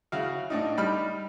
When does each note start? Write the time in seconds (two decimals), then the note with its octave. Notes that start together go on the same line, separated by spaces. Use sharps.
0.12 C#3 E4 F#4 F5
0.50 A2 D4 D#4
0.78 G3 D#4 B5 F6